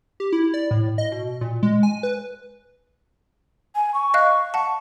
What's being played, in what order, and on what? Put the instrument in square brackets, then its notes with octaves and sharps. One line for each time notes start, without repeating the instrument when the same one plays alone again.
[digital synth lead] G4
E4
D5
A2
D#5
B2
A#2
G#3
G#5
B4
[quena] G#5
C#6
[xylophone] D#5 F5 F#6
F#5 A5